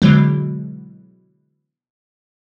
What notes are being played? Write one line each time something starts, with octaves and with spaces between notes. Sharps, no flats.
B2 D3 E3 F#3 G#3